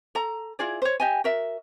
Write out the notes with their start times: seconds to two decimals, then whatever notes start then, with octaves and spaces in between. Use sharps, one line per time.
0.15 A4 A#5
0.59 E4 F4 G#4 D5
0.82 C5 C#5
1.00 G4 D#5 G#5
1.24 F#4 A#4 E5